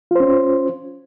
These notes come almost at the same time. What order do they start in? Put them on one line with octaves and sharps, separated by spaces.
F4 C5 C#4